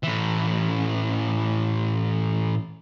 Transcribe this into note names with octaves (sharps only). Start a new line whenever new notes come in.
A2 E3